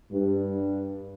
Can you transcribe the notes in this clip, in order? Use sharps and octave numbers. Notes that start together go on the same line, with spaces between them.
G2